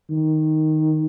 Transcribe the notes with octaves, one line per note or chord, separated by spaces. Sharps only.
D#3